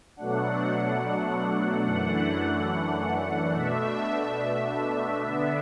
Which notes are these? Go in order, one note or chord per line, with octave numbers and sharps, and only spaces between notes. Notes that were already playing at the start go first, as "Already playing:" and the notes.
B2 F#3 A3 D4 F#5
F#2 E3 A3 D4 F#5
B2 A3 D4 E5
D3 B3 D4